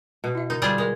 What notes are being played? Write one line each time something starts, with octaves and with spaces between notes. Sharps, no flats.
B2
E4 E5
D3 D#4
G3 F4 G#4
G#3 A#4 D#5